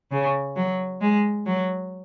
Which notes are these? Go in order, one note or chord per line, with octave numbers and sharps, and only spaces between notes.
C#3
F#3
G#3
F#3